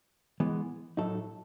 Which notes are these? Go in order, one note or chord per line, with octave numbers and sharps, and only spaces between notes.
E3 G#3 B3
A2 F#3 A3 D#4 A4